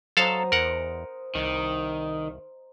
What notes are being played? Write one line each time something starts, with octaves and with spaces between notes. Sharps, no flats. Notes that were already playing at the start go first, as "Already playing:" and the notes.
F#3 A4 C5 D#5 F5 A5 A#5
E2 A#4 F#5
C2 D#3